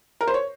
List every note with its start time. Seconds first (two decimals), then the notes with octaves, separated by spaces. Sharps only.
0.21 A#4
0.27 C5
0.34 C#5